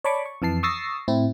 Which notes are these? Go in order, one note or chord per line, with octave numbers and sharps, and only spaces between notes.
C#5 D5 A5 B5 C#6 D6
C#6
F2 E3 A5 C7
C#6 D#6 E6 A6 A#6 C7
A2 C4 E4